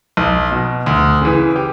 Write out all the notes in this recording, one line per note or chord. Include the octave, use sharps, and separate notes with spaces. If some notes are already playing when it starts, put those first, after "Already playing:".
B1
B2
D2
C#3 E3
G4